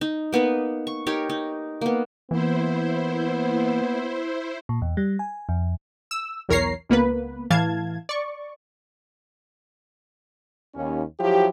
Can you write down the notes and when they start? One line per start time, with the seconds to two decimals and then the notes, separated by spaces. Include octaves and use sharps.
0.01 D#4
0.33 A#3 B3 D#4 B4
0.87 C#6
1.07 D#4 G4 A#4 C#5
1.30 D#4
1.81 A#3 B3
2.31 E3 A#3 B3 E4 C5
4.69 A#2
4.82 E2
4.97 G3
5.19 G#5
5.49 F2
6.11 E6
6.49 B1 E2 A#4 C#5 A#5 C7
6.89 C#2 A#3 B3 B4
7.50 A2 E3 F5 A5 G#6
8.09 D5 C#6
10.75 D#2 C#4
11.20 F3 F#3 E4 G4